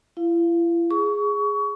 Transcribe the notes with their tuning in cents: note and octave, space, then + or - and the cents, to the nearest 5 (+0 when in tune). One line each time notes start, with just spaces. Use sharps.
E4 +40 F5 +0
G#4 -5 C#6 +25